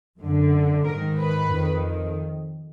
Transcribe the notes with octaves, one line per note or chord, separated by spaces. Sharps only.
F#2 D3
G#2 D#3 A#4
B4
F2 D#3